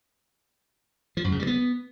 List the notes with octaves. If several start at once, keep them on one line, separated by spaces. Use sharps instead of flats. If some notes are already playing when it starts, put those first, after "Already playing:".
F3
F#2
C#3
G3
B3